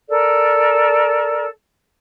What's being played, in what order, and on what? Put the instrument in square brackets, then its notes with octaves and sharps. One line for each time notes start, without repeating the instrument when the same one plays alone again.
[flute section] A4 A#4 D5